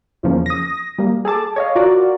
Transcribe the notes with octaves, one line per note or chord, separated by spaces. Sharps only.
E2 C#3 F3 A#3 C#4
D#6 A#6
G3 A#3
G#4 A4 A5 D6
C#5 D#5 F5
F4 F#4 A#4 D5